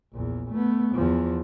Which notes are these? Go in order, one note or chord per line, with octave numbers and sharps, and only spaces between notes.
A#1 E2
A3 B3
E2 F3